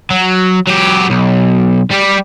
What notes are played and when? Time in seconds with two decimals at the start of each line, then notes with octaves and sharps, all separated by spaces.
0.10 F#3
0.67 F#3 G4
1.10 B1
1.91 G3 G4